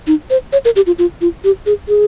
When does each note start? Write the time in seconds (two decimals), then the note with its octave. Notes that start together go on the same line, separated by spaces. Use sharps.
0.07 D#4
0.30 C5
0.53 C#5
0.65 A#4
0.76 G4
0.87 F4
0.99 F4
1.21 F4
1.44 G4
1.66 G#4
1.88 G#4